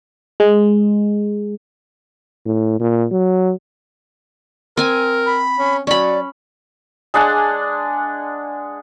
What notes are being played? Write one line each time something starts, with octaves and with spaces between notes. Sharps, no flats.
G#3
A2
A#2
F#3
C4 A#4 G#5
B5
C#4
F#3 C#4 D5 B5
G#3 D4 F#5 G#5